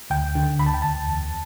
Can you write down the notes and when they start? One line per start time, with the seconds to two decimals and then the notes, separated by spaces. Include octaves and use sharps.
0.10 D2 G5
0.35 D3
0.59 D2 B5
0.66 A5
0.74 G5
0.82 D2 A5
1.08 E2